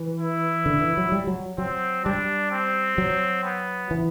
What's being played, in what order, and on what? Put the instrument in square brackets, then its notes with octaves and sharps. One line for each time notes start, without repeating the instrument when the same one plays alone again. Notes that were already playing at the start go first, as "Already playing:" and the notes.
Already playing: [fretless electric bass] E3
[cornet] E4
[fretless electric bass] D3
E3
F#3
G3
F#3
[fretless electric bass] F#3 [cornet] C4
[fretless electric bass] G3 [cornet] D4
[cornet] C4
[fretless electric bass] F#3
[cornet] B3
[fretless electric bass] E3